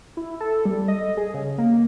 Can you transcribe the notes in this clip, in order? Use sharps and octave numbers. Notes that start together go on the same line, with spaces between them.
E4
A4
G3
D#5
G#4
C#3
A#3